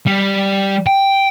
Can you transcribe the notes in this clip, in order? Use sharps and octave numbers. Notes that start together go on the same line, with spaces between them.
G3
G5